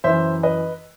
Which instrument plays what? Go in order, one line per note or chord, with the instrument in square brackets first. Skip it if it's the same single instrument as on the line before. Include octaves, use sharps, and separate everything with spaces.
[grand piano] F#2 E3 C5 E5
B4 D#5